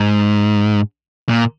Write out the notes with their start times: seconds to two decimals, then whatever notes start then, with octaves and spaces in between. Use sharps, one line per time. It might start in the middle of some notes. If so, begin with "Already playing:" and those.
Already playing: G#2
1.29 A#2